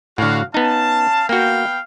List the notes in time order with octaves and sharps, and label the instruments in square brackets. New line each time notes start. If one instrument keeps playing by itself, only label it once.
[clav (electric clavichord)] A2 D3 [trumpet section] F#4 F5
[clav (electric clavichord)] B3 D#4 [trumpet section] C#4 F5 A5
[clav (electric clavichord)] A#3 F#4 [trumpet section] B3 F5 G5